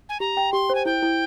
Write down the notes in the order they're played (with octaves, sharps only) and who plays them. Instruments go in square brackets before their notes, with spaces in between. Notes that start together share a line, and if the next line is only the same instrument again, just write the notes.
[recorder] G#5
[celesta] G4 [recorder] A#5
[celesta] G5
[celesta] G4 [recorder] C6
[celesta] C5
[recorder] G#5
[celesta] E4 [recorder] G5
[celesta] E4